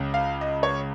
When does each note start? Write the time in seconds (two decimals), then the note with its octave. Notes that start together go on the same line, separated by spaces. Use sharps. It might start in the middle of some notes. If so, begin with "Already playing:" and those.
Already playing: C#2 C#3
0.14 F5
0.41 D#5
0.63 C#5